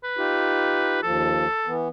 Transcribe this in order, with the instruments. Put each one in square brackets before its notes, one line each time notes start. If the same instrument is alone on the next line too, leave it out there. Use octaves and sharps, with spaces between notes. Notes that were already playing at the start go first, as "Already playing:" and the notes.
[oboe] B4
[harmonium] D#4 F4 G4
[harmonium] D#2 F3 [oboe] A4
[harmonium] E3 B3